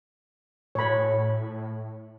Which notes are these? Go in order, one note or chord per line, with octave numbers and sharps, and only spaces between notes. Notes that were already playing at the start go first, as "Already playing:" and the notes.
A2 C#5 B5